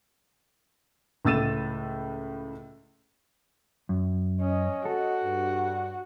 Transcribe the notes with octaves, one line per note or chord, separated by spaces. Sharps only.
C#2 A2 E6 A6 D#7 E7
F#2
C#4 D#5
F#4 A4
G2